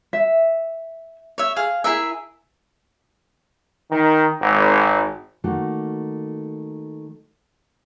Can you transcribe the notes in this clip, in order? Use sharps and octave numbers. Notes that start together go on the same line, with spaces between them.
E5
C#5 E5
G#4 F5
E4 G#4 A#4 E5
D#3
G#1
D#3 A3 A#3 F#4